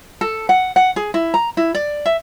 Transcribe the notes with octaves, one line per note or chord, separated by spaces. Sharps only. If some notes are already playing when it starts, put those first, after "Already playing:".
A4
F#5
F#5
G#4
E4
A#5
E4
D5
E5